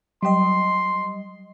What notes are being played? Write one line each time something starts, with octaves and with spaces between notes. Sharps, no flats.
F#3 G3 D#5 G5 C6